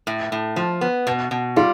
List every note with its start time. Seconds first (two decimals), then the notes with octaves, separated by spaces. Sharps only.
0.07 A2
0.32 A2
0.56 F3
0.81 B3
1.07 B2
1.31 B2
1.56 G3 F4